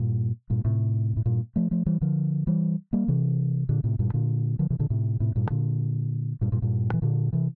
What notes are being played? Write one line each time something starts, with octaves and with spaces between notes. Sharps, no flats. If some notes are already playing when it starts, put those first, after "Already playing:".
Already playing: G2 A#2
G2 A#2
A2 C3
A2
G2 A#2
F3 A3
F3 A3
E3 G3
D3 F3
E3 G3
G3 A#3
C3 E3
A#2 D3
A2 C3
G2 A#2
A#2 D3
D3 F3
C3 E3
A#2 D3
A2 C3
A2 C3
G2 A#2
A#2 D3
G2 A#2
G2 A#2
G2 A#2
E3
A#2 D3
C3 E3